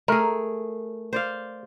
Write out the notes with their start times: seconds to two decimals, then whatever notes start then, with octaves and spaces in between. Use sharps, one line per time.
0.08 A3 G#4 A#4
1.13 C5 D5 F5